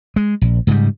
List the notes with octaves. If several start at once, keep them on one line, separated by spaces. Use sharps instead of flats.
G#3
A#1
G#2 C#3 F#3 G3